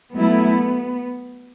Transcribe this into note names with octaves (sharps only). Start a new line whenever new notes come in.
F#3 A3 B3 E4